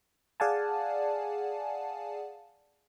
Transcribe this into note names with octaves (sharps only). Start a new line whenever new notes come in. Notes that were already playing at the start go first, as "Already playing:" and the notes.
G#4 D5 F5 F#5 G#5 A5